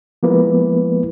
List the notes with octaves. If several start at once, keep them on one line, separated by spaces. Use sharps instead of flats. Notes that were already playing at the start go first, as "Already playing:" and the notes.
F3 G#3 A#3 B3 E4 B4